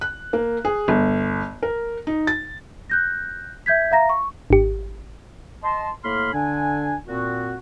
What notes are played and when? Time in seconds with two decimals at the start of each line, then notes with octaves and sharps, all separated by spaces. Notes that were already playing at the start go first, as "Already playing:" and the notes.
0.01 F#6
0.33 A#3
0.65 G#4
0.88 G1
1.63 A#4
2.07 D#4
2.27 A6
2.90 F#6 G6 A#6
3.66 E5 G6 G#6 B6
3.91 E5 F5 A#5 A#6
4.09 C#6
4.50 G#1 G4
5.63 D#5 A5 C6
6.04 A2 A#3 B5 C6 F6
6.33 D3 D4 G#5
7.08 A#2 C4 F#4